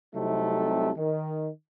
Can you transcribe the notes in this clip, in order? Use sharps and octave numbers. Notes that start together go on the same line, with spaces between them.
C2 C3 F#3 A3 D#4 A4
D#3